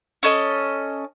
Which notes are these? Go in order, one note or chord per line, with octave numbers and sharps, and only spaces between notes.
C#4 A4 D#5